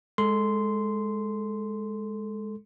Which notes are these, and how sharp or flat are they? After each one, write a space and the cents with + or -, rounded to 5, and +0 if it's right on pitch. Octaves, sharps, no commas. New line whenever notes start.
G#3 +0 A4 +0 C6 -10